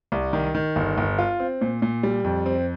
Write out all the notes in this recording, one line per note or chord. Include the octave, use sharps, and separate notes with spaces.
C2
D#3
D#3
G1
G1
F4
C4
A#2
A#2
G3
F2
C4